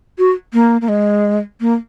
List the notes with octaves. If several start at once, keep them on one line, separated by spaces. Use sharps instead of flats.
F#4
A#3
A#3
G#3
A#3